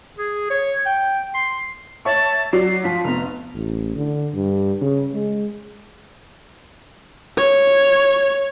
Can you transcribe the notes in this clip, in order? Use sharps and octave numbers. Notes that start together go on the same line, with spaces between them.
G#4
C#5
G5
C6
C#5 E5 A5 C#6
F#3 D5 C7
F3 F4 B6
F1 B3 A#5
A1
D3
G2
C#3
G#3
C#5